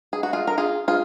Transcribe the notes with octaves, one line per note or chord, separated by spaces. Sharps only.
G#4
F#4
F4 G#4
A#4
F4 G#4
F4 G#4